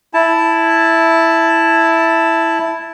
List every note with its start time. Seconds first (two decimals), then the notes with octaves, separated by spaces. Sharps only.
0.14 E4 A5